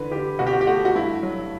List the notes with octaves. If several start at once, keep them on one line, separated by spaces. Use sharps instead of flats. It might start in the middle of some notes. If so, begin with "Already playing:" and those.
Already playing: D3 E3 B4
D3 G4
B2 F#4
G4
F#4
G4
A3 F#4
F#4
G2 E4
F#3